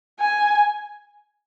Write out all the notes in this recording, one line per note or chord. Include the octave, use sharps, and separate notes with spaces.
G#5